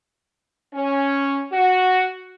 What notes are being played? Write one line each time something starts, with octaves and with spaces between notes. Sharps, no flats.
C#4
F#4